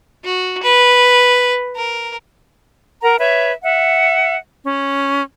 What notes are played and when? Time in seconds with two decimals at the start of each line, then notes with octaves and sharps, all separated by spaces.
0.24 F#4
0.63 B4
1.76 A#4
3.03 A#4 F#5 A#5
3.19 B4 C#5 E5
3.62 E5 F#5
4.63 C#4